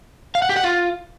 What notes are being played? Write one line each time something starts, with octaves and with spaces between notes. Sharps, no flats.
F5
F#5
G4
F#5
F4